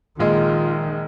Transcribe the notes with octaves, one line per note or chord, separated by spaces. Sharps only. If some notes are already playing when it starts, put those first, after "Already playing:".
A#1 D#3 G#3 F4